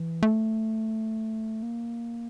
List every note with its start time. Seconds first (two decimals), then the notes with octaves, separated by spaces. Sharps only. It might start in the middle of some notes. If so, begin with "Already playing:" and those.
Already playing: E3
0.23 A3
1.63 A#3